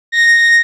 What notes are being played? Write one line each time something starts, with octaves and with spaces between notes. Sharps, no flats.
A#6